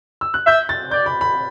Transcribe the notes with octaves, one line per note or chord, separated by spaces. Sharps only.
E6
F#6
E5 G6
A6
D5 G6
B5
B5